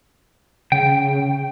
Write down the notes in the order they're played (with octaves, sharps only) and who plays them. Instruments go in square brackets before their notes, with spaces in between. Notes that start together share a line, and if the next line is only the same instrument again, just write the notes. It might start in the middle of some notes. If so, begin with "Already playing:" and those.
[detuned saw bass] C#3 [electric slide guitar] G5